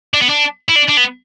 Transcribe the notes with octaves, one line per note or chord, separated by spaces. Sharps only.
D4
B3
D4
E4
D4
D4
B3